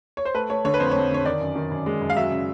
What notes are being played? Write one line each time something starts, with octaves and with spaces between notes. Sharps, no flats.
C#5
C5
A3 B4
A3 C#5
D3 C#5
B4
F2 C5
C#5
F2
D3 C#5
D#3 D5
F#2
D#3
F#2
G#3
F#2
F5
F#3 E5
C#3